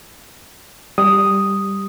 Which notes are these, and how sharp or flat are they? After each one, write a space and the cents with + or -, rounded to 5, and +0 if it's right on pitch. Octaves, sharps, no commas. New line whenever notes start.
G3 +0 D#6 +0